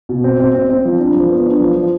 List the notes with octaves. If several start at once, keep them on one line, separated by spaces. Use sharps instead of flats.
B2
C4
C4
C4
C4
F3
D4
F3
B3
D4
F3
F3